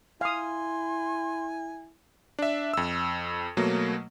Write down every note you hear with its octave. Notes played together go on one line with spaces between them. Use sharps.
E4 F5 G#5 C6 D#6
D4 E5
F2 E6
B2 F#3 A3 A#3